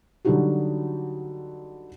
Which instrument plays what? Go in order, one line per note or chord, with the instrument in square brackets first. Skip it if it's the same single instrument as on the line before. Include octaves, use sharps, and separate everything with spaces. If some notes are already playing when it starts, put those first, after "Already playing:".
[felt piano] D3 F#3 G3 D#4 F#4 G4